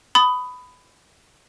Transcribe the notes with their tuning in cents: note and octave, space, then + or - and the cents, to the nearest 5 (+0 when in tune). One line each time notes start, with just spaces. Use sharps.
B5 +15 D#6 +0